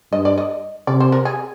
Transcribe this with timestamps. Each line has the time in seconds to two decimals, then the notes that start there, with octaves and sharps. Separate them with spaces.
0.12 G2 D#5
0.25 D5
0.38 D#5
0.87 C3 D5
1.00 C5
1.12 A#4
1.25 G#4